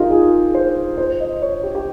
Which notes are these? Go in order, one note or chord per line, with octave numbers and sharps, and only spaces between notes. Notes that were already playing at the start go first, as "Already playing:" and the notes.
Already playing: D#4 F4 G4 G#4 A#4
G#4
C5
C5
D#5
C#5
G4
G4